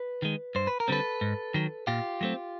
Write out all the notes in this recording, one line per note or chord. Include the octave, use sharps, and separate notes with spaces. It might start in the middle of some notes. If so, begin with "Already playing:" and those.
Already playing: B4
D#3 G#3
G2 C5
B4
A#4
D3 G3 C4 A4 B4
G#2
D#3 F#3
A#2 F4 G4
F#3 A3 C4